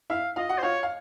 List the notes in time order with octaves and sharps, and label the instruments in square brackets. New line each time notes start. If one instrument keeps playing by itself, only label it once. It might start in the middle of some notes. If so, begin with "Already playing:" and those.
[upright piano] E4 E5 [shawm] F5
[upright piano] F4 F5 [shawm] D#5
[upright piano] F#4 F#5
[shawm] C5
[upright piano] F4 F5 [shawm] C#5
[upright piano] F5